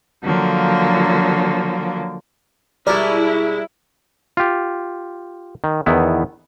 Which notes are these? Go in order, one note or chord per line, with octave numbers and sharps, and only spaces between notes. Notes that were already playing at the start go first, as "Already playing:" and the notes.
D3 F3 F#3 A#3
B2 G3 G#3 E4 A#4 D5
F4 G4
D#3
E2 D#3 B3 E4